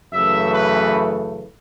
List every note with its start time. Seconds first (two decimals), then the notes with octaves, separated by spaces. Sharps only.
0.13 F#2 C#3 E3 A3 E5
0.53 B4